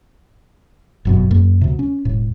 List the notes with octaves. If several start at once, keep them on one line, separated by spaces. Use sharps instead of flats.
G1 F#2 B2
F#2 A#3
D2 C3
C#4
E1 A2